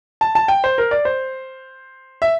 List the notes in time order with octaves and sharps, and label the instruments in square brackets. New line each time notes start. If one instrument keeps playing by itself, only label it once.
[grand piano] A5
A5
G5
C5
A#4
D5
C5
E5